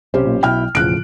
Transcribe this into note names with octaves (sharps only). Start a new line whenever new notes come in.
B1 C3 C#4 G4 C5
B1 A#2 A#3
B1 B2 E4 G5 F6
E1 A2 C#3 F3 F#6 D7